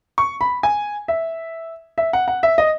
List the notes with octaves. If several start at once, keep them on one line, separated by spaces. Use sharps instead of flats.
C#6
B5
G#5
E5
E5
F#5
F#5
E5
D#5